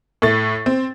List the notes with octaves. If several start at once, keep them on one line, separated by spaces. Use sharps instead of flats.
A2 A3 A6
C4